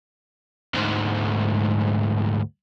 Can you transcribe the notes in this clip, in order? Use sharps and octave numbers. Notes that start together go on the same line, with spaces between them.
D2 G#2